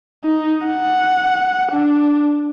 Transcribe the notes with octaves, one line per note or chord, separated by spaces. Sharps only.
D#4
F#5
D4